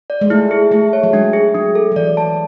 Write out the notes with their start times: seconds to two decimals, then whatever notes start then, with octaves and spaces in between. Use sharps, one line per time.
0.10 D5
0.21 G#3
0.30 A3 E4
0.51 G#4
0.72 A3 G#4
0.93 C#5
1.03 F#3
1.13 G#3 D4
1.33 G#4
1.54 F#3 D4
1.75 A4
1.92 F#3
1.96 E3 D5
2.17 A5